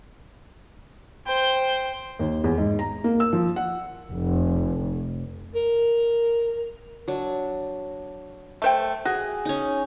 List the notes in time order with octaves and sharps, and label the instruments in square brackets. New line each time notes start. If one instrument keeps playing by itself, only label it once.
[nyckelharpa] C5 G5
[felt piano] D#2
E2
G#2
A#5
A#3
E6
F3
F#5
[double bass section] F1
[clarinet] A#4
[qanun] F#3 D4
[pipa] A3 C5 G5
[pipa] F#4 [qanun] G#4
[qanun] C#4 D#4